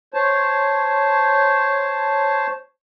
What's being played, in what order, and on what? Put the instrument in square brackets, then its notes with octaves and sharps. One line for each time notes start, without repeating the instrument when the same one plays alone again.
[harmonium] C5 C#5 A5